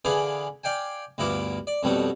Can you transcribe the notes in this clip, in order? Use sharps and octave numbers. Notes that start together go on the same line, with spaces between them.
D3 E3 G#4 B4 F5 D6
D5 F5 G5 G#5
D2 G2 B3 E4 F4 D6
D5
F2 B2 F#3 G3 A3 B3